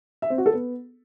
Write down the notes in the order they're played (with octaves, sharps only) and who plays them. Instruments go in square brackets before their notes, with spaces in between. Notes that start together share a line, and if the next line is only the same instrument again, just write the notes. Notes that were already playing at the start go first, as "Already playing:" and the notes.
[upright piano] E5
C4
F#4
A4
B3